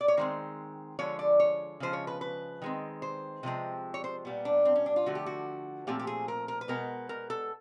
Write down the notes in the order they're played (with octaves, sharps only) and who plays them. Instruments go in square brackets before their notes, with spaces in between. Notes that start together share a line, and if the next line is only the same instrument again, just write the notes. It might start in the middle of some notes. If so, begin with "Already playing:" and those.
[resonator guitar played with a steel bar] D5
C#5
D#3 G#3 C4 C5
D3 F3 G#3 C#5
D5
C#5
C#3 F3 G#3 C5
C#5
B4
B4
D#3 G#3 C4
C5
C3 F3 G#3 C4
C#5
C5
A#2 G3 B3
D4
C4
C#4
D4
F4
D3 F3 A3 F#4
G4
F#4
A#2 F3 A3 C4 G4
G4
G#4
A#4
A#4
B4
B2 G#3 B3 A#4
A#4
A4